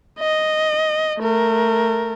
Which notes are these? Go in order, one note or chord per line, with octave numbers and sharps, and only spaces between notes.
D#5
A3 A#4